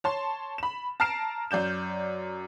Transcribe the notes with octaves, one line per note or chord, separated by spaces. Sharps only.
C#5 A5 C6
B5 E7
A5 A#5 F6 C7 D7 E7
F#2 D5 G6 E7